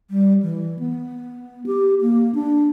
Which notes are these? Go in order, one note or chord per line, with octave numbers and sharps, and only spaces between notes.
G3
E3
B3
G4
A#3
D4